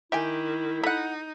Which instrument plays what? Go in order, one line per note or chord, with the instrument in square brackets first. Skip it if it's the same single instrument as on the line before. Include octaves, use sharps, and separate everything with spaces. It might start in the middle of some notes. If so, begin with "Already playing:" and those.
[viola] D#3 [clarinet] E4 [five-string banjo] G4 [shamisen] E5 G5 G#5
[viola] D#4 [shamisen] A4 [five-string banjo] F#5 B5